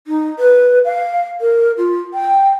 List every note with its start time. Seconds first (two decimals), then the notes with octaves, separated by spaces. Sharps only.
0.07 D#4
0.39 B4
0.85 F5
1.41 A#4
1.77 F4
2.14 G5